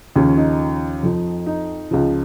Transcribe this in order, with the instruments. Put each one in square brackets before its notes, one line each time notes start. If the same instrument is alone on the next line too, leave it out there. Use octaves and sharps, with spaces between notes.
[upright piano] D#2 C#3 F3 C#4
D#4
F2 F3
D#4
C#2 C#3 F3